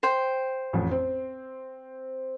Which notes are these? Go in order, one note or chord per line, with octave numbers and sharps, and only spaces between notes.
C5 G5
A1 F2
C4